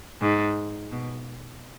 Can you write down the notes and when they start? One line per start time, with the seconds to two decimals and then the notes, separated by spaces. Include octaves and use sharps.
0.21 G#2
0.91 B2